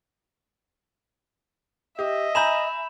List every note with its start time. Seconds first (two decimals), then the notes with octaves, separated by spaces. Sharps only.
1.99 G4 D#5 E5
2.35 G#5 A#5 B5 G6 E7